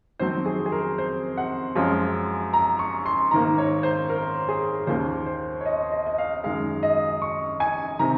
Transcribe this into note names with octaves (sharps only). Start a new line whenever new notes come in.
F2 D#3 F#3 C4 C5
G#4
G#4
A#4
C5
F#5
F#2 F3 G#3 C#4 F4
A#5
C#6
C6
G#2 D#3 A#3 A#5
C#5
C5
A#4
G#4
D#2 D#3 A#3 C#4 F4 C5
C5
C#5
D#5
D#5
D#5
F5
F#2 D#3 G#3 F5
D#5
C#6
G#5
C3 D#3 A#5